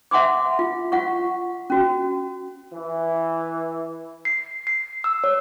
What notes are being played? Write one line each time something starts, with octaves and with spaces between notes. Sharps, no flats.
E5 F#5 G#5 C6 D6
F4
F4 F#5 C#6
C#4 F#4
E3
C7
C7
E6
C#5